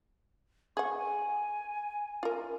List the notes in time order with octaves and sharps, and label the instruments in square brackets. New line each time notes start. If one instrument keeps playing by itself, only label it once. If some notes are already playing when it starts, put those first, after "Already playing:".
[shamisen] G#4 F#5 [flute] C#6
[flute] G#5
[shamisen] F4 A#4